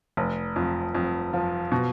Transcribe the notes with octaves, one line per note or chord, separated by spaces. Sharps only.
F1
F2
F2
F3
B2